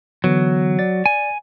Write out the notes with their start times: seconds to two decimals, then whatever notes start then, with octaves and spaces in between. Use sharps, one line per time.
0.24 D3 E3 F#3 B3
0.79 D5 A6
1.06 G#5